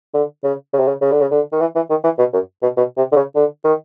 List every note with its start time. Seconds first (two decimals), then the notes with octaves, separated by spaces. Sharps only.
0.14 D3
0.44 C#3
0.74 C#3
0.80 C3
0.88 C#3
1.02 C#3
1.12 D3
1.21 C#3
1.31 D3
1.52 D#3
1.61 E3
1.76 E3
1.90 D#3
2.04 E3
2.19 B2
2.33 F#2
2.63 B2
2.77 B2
2.97 C3
3.12 D3
3.16 C#3
3.36 D3
3.65 D#3